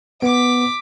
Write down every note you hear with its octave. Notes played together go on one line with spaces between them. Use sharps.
B3 D6 B6